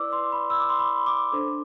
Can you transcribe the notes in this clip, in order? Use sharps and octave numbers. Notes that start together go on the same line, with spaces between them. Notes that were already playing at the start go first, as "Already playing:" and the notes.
Already playing: E4 B4 D5 D6 E6
C6
B5
E6
D6
C6
B5
D6
D4 A4 C5